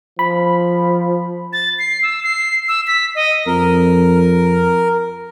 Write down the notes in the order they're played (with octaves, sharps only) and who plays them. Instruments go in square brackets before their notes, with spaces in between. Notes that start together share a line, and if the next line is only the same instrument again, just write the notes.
[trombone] F3 [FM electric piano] B5
[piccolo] A6
C7
E6
C7
E6
B6
D#5
[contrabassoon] F2 [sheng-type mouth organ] A#4